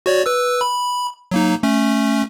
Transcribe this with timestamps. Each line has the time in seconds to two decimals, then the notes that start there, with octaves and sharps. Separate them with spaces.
0.06 F#4 C#5 D5
0.26 B4 E6
0.61 B5
1.31 F#3 A#3 D#4
1.63 A3 C#4